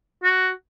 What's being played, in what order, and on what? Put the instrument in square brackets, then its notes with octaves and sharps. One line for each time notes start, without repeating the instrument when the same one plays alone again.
[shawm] F#4